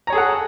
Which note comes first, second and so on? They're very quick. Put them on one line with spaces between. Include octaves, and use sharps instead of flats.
A#5 C#5 G#4 A4 F#5